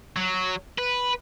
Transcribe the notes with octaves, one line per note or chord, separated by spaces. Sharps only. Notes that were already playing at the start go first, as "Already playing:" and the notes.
F#3
B4